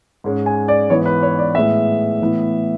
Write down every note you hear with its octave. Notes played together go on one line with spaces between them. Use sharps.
G#2 G#3 C#4
G#5
D5
G#2 E3 B3 C#5
B4
C#5
D5
A2 G#3 B3 E5
A2 E3 B3